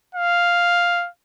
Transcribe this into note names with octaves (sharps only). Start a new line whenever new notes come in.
F5